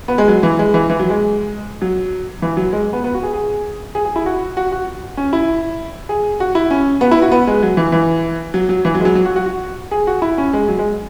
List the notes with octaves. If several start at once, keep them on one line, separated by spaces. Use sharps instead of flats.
B3
G#3
F#3
E3
G#3
E3
E3
F#3
G#3
F#3
E3
F#3
G#3
B3
B3
F#4
G#4
G#4
G#4
G#4
E4
F#4
F#4
F#4
C#4
E4
G#4
F#4
E4
C#4
B3
E4
F#4
B3
G#3
F#3
E3
E3
F#3
F#3
E3
F#3
G#3
F#3
F#3
F#4
F#4
F#4
G#4
F#4
E4
C#4
G#3
F#3
G#3